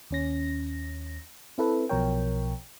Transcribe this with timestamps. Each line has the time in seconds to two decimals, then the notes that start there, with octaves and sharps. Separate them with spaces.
0.10 D#2 C#4 A#6
1.58 C4 E4 A4 B4 E5
1.89 B1 B2 F3 A#4 C#5 G5